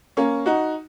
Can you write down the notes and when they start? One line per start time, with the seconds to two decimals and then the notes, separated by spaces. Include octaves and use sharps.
0.17 A#3 C#4
0.46 D#4 F#4